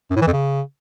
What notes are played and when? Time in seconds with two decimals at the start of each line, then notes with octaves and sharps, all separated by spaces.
0.11 F#2
0.16 A2
0.22 E3
0.27 F2
0.33 C#3